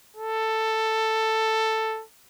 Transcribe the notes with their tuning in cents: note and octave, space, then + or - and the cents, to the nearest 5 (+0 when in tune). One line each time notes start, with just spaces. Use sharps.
A4 +5